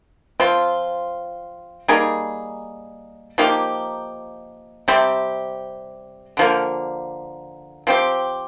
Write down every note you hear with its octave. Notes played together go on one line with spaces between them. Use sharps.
F3 C4 F4
G3 A#3 D#4 G#4
F3 A#3 D#4 G4
C3 G3 C4 G4
D3 F3 A#3
F3 C4 G4